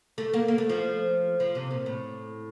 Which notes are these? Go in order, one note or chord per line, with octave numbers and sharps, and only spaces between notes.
A3
A#3
A#3
A3
F3
F3
C3
A#2
A2